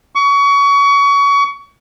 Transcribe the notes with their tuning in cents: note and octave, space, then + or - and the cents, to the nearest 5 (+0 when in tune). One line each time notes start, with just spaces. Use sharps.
C#6 +30